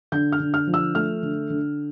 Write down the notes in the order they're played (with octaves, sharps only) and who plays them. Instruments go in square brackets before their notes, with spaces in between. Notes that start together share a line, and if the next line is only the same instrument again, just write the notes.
[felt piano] D3 G6
F6
D3
F6
F3
E6
A3 F6
D3
D3